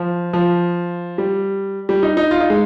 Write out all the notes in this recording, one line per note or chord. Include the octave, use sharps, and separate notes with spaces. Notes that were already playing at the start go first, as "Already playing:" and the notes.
Already playing: F3
F3
G3
G3
D#4
D#4
F4
D#4
G#3